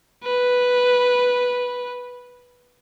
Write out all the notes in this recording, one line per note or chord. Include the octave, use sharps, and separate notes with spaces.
B4